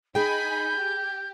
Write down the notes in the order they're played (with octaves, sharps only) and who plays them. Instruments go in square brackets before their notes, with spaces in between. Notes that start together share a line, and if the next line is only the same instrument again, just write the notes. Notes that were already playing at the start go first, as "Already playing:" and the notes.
[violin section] D#4 G#5 B5 [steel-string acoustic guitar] G#4 G5 [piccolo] G6
[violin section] G4